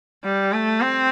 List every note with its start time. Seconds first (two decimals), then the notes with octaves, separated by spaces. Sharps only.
0.24 G3
0.53 A3
0.81 C4